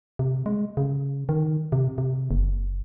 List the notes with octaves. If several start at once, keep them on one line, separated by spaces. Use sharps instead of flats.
C3
G#3
C#3
D#3
C3
C3
F#1